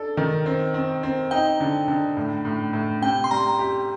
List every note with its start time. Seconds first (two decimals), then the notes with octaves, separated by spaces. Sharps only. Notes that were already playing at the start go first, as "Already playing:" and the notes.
Already playing: D4 A4
0.17 D#3
0.46 C4
0.74 C4
1.03 C4
1.31 D#4 G5
1.60 D3
1.88 D3
2.17 A2
2.45 A2
2.73 A2
3.02 C3 G5
3.24 C6
3.31 G3 A#5
3.59 G4